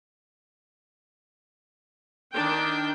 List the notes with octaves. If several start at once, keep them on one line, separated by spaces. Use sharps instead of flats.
D#3 D4 G5